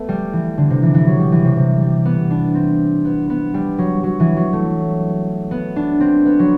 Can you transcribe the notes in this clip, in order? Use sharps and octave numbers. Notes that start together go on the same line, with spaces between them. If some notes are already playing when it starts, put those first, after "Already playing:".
Already playing: A3 B3
G3
E3
D3
C3
E3
E3
F#3
G3
E3
C3
C3
G3
B3
D4
C4
B3
B3
G3
F#3
F#3
E3
F#3
A3
B3
D4
C4
B3
F#3